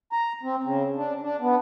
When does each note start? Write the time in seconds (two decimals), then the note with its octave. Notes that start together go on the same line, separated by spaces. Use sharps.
0.12 A#5
0.43 C4
0.64 C#3
0.96 D4
1.21 D4
1.40 B3